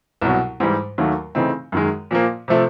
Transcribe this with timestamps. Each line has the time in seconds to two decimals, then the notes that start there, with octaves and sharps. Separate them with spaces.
0.22 C2 B2 F#3
0.60 G#2 E3 G3
0.98 D#2 D#3 F#3 A3
1.35 C#3 E3 A3 C4 D#4
1.72 F#2 D#3 G#3
2.11 A#2 F3 A#3
2.48 C3 F3 A3